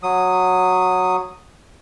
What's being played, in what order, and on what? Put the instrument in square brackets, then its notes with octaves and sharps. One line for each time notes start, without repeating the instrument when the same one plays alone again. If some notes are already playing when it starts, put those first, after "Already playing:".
[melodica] F#3 D#6